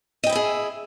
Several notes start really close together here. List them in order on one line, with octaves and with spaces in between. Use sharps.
D#5 G5 E4 E5 G#4